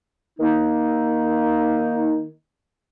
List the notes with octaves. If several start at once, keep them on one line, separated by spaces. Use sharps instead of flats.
D#3 A#3 D#4